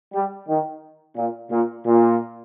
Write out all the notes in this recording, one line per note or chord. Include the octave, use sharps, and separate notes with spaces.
G3
D#3
A#2
A#2
A#2